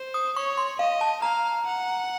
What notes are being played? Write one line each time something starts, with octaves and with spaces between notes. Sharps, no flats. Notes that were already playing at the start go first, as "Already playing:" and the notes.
Already playing: C5
D#6
C#5 C#6
C6
D#5 F5
A5
F5 A#5
F#5